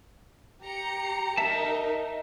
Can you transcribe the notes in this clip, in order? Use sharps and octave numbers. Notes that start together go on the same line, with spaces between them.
G4 A#5 C#7
D#4 A#4 E5 A5